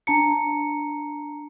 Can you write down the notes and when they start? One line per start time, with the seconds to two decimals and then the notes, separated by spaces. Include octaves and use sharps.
0.07 D4 A5 A#5 C#7